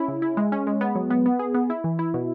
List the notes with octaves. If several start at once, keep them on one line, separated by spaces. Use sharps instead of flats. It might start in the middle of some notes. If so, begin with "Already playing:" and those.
Already playing: C#4 E4
C#3
E4
G#3
C#4
G#3
B3
F#3
B3
B3
G#4
B3
E4
E3
E4
B2